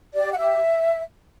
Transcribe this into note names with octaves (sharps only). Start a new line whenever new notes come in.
G4 D5
F#5
G4 E5